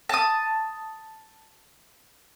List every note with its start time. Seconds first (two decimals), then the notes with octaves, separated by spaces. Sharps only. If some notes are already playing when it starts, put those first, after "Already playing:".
0.09 A5 D#6